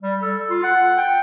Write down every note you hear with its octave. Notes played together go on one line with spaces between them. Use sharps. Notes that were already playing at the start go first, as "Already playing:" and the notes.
G3
A4
F4
F#5
G5